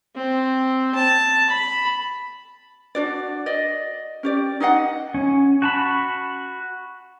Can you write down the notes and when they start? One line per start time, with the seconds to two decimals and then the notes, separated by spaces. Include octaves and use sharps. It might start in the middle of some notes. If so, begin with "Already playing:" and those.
0.16 C4
0.95 A5
1.50 B5
2.95 D4 F#4 D5
3.46 D5 D#5
4.23 C#4 G4 D5
4.60 D#4 D#5 F5 F#5
5.14 C#4
5.62 F#4 A5 B5